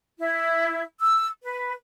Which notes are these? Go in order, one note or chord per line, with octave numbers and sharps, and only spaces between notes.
E4
E6
B4